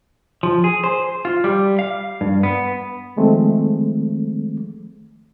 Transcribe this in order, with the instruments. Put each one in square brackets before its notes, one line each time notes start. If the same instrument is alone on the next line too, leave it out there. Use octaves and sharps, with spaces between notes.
[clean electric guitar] F3
G#4
C5
F4
G3
F5
G2
B3
[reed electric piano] D#3 F3 G#3 A3 C4